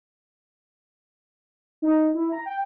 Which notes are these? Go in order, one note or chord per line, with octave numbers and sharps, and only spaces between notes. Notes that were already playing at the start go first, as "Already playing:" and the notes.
D#4
E4
A#5
G5